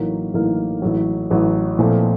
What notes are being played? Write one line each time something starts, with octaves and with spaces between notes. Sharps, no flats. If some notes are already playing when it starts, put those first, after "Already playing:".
Already playing: A1 A2 F#3 A#3 D#4
A1 A2 F#3 A#3 D#4
A1 A2 F#3
A1 A2 F#3
A#2 F3 A3 C4